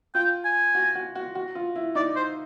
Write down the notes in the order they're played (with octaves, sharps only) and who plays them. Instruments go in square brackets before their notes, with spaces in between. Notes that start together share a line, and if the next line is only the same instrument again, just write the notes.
[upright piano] F4 [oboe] G5
[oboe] G#5
[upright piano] F#4
F#4
F#4
F#4
F4
E4
[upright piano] D#4 [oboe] D5
[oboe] C5